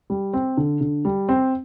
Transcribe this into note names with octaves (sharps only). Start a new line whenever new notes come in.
G3
C4
D3
D3
G3
C4